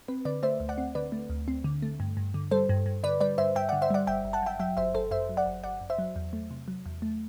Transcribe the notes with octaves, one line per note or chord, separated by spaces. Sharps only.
C4 B4
D3 B4 D5
A3 C5 E5
D2
D5 F#5
C4
D3 B4 D5
A3
D2
C4
D3
A3
G2
G2
D3
G3 A4 C5
G2
G2
D3 B4 D5
G3 B4 D5
G2 C5 E5
G2 E5 G5
D3 D5 F#5
C5 E5
G3 D5 F#5
G1 E5 G5
G1
F#5 A5
F#2 E5 G5
F#3 E5 G5
G1 C5 E5
G1 A4 C5
F#2 C5 E5
F#3
D5 F#5
G1
G1 D5 F#5
F#2
C5 E5
F#3
E2
A3
C3
F#3
E2
A3